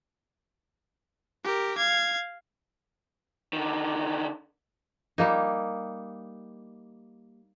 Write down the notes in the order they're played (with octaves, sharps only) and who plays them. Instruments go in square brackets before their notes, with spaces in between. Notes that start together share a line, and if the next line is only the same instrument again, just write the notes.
[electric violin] G4 A#4
F5 G#6
[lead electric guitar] D3 D#3
[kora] G3 A#3 D#4